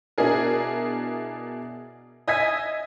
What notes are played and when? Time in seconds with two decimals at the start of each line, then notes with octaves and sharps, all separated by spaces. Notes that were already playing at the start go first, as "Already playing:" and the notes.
0.18 B2 D4 E4 G#4 A#4
2.28 D#5 E5 G#5 E6 G#6 B6